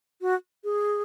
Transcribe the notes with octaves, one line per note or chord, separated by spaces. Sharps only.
F#4
G#4